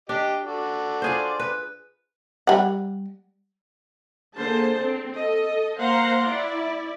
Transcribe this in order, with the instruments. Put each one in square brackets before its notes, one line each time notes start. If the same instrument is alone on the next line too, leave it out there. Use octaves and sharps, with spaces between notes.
[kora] D4 [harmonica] G4 D#5
[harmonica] F#4 A4 D5
[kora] F4 G#4 C5
B4
[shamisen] G3 F#5
[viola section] D3 A#3 G#4 C5 A5
C4
A4 D#5
A#3 C5 F5 F#5 A#5 C6
E4 D5